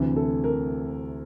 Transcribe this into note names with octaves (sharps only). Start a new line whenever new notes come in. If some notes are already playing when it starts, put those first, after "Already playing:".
Already playing: D2 C3 E3
A4
A#4